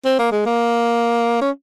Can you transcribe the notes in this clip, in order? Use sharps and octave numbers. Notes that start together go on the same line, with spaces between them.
C4
A#3
G#3
A#3
C#4